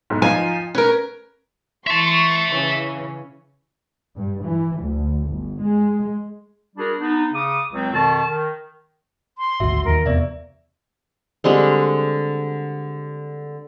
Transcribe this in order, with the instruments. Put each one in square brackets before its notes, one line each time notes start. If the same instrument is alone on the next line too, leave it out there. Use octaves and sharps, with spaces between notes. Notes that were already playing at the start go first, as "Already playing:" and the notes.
[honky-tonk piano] B1 G#2
[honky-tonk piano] F3 D#4 F4 [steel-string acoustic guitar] G#5
[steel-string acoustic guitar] C#4 A#4 [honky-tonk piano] B4
[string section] E3 C6 C#6 [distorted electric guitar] E5 A5
[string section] C#3 E3 C#4
[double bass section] G2
E3
D2
G1
G#3
[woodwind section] G3 D4 F#4 G#4 A#4
B3 D4 D#4
C#3 D6 D#6
C#2 F#3 C4
F2 B2 D#3 A5
D#3
[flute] C6
[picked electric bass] G#1 D2 [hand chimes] F#4 E5
[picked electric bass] D#2 D3 D#3 [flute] A#4
[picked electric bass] E2 C3 [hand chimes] B3 D5 E5
[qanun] D3 G3 G#3 C4